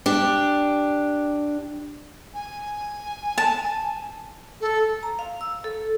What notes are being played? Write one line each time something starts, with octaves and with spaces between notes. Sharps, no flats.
D4 G4
G#5
A5
A4
A#5
F5
E6
A4